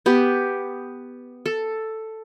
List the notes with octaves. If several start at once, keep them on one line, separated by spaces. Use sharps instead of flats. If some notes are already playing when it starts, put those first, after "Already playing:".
B3 G4
A4